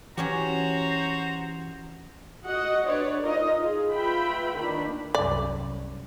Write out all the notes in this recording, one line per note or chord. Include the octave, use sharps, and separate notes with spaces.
E3 F#3 C#4 F#4 G4 C5 A#5
F#4 D#5 F#5
D4 B4 C#5 D5
D#4 F4 A#4 D#5
F4 G#4
F4 B4 E5 G5 B5
D#3 A#3 D4 B5
C2 F#2 D5